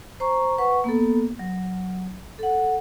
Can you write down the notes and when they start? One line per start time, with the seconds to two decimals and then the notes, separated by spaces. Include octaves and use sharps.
0.20 C5 A#5 C#6
0.58 B4 F#5 C#6
0.84 A#3 B3 A4
1.39 F#3
2.39 A4 F#5